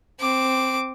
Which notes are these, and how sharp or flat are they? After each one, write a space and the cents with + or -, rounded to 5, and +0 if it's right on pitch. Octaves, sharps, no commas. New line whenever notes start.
C4 +0 D6 +0